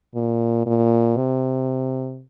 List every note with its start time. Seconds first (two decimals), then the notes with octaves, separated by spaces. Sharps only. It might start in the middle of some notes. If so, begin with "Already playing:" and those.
0.15 A#2
0.66 A#2
1.17 C3